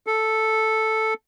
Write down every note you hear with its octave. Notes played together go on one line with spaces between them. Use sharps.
A4